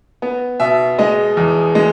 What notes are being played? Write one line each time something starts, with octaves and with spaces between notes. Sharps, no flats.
B3
B2 E5
G#3 D#5
E2
G#3